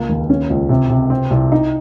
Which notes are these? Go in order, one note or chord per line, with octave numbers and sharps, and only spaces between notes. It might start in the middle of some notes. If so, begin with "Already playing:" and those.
Already playing: C#2 A#3
D#2
C#4
C#2
C3
C3
C4
C2
D#4